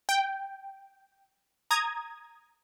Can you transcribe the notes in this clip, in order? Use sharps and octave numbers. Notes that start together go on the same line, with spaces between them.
G5
A#5 D#6 G#6